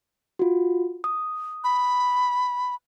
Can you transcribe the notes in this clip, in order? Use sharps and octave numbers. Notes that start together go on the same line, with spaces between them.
F4 F#4
D#6
B5